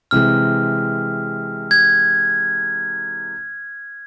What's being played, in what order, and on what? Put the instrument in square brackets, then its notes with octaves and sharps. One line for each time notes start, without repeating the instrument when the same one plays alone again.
[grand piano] C3 E3 G#3 [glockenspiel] F6
[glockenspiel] G#6